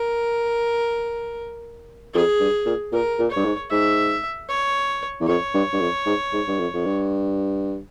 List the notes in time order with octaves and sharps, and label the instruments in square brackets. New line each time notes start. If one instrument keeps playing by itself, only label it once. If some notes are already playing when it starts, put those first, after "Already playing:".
Already playing: [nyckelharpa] A#4
[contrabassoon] F2 [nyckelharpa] G#4
[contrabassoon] G2
A#2
[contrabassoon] A#2 [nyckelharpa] A#4
[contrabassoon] A#2
[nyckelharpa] C#5
[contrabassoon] G2
G#2
[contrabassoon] G#2 [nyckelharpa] E5
[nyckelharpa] C#5
[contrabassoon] E2
[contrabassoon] F2 [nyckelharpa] C#5
[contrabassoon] G2
G2
F2
G#2
G#2
G2
F2
F2
G2